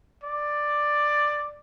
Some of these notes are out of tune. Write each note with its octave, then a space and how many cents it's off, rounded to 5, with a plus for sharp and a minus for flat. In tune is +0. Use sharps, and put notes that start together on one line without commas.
D5 +10